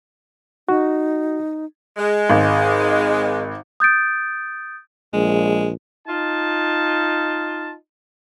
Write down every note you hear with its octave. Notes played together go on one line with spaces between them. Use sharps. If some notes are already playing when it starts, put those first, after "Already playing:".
D#4 F#4
G#3
G#1
D#6 G6 A6 D7
A#1 G#3
D#4 F4 A5